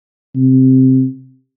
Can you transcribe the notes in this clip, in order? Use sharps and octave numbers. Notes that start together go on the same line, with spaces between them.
C3